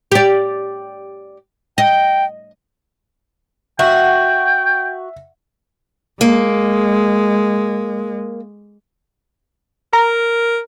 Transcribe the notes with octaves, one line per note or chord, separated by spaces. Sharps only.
G4 D5
D#5 G5
F#4 E5 G5
G#3 A#3
A#4 A#5